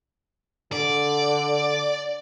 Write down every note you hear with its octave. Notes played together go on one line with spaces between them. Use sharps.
D3 D5